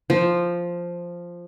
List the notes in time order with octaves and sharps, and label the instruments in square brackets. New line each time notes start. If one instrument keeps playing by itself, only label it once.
[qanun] F3